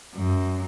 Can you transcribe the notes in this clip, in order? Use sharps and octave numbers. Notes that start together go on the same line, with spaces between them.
F#2